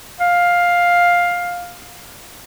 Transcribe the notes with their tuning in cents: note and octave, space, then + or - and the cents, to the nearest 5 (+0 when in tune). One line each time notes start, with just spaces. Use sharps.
F5 +10